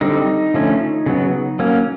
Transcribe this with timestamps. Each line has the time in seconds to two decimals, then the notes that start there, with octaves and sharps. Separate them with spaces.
0.01 D3 G3 C4 D#4
0.54 D3 F3 A3 C#4
1.06 C#3 F#3 B3
1.59 F#3 A#3 C#4